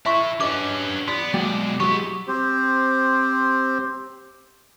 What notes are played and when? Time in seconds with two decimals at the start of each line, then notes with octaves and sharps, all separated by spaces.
0.06 E4 A4 E5 C6 C#6
0.41 F#3 C#4 G4 B4 D#5 D6
1.08 B3 D5 C6
1.34 B2 F#3 G#3 A#3 D5 G5
1.80 F#3 G#3 B3 E4 G4 C#6
2.28 C4 G4 C5